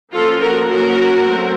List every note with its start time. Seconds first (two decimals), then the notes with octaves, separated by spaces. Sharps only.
0.13 F3 A#3 C#4 F4 A4
0.41 F#4 A#4
0.68 F#3 A#3 C#4 F#4 A#4
1.25 F#3 A3 C4